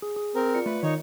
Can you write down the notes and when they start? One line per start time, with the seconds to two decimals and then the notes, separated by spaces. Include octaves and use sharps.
0.02 G#4
0.16 G#4
0.35 C4 A#4
0.55 F4 D5 C#7
0.66 A3 B4
0.83 D#3 D#4 C#5